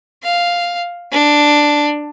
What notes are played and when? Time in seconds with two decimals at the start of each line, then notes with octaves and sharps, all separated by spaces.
0.23 F5
1.12 D4